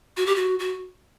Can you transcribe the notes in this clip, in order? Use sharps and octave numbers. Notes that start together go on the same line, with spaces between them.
F#4
G4
F#4
F#4